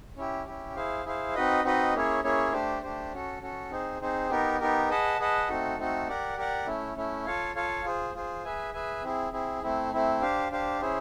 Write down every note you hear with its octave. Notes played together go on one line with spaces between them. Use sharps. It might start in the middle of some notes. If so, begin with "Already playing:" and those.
C#4 E4 G4
C#4 E4 G4
E4 G#4 C5 F5
E4 G#4 C5 F5
C4 D#4 F#4 B4 D#5
C4 D#4 F#4 B4 D#5
A#3 C#4 E4 G#4 C#5
A#3 C#4 E4 G#4 C#5
A3 D4 G4 C5
A3 D4 G4 C5
C#4 F#4 A4
C#4 F#4 A4
C4 D#4 G#4 C5
C4 D#4 G#4 C5
B3 D#4 G4 A#4
B3 D#4 G4 A#4
G#4 B4 D#5 F#5 A5
G#4 B4 D#5 F#5 A5
A3 C4 D#4 F#4 A4
A3 C4 D#4 F#4 A4
G4 A#4 D5 F#5
G4 A#4 D5 F#5
A3 C#4 E4
A3 C#4 E4
F4 A4 C#5 F5
F4 A4 C#5 F5
F4 G#4 C5
F4 G#4 C5
G#4 B4 E5 G#5
G#4 B4 E5 G#5
C4 E4 G#4
C4 E4 G#4
A3 C4 E4
A3 C4 E4
D4 G4 C5 F5
D4 G4 C5 F5
C#4 E4 G#4 C5